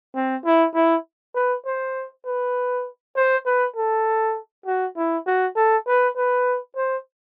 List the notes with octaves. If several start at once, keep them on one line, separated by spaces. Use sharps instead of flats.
C4
E4
E4
B4
C5
B4
C5
B4
A4
F#4
E4
F#4
A4
B4
B4
C5